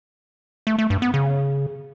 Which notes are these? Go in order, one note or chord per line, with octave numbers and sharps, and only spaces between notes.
A3
A3
G2
B3
C#3